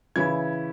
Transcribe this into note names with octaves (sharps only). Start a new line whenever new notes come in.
C#3 E3 C#4 E4 G#6